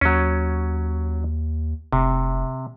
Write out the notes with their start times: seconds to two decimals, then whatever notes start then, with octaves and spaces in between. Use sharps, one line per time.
0.01 D#2 F#3 C#4
1.92 F1 C3